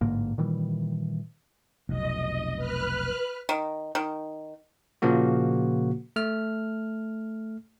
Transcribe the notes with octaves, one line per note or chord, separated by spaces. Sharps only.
A1 G#2 D3 A#3
A#2 D#3 E3 G3
F1 B1 D#5
B4 F6 F#6
D#3
D#3
A#2 C#3 F3 A#3 F#4
A3 F6